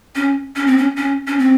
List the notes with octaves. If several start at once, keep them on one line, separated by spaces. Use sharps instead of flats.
C#4
C#4
C4
C#4
C#4
C#4
C4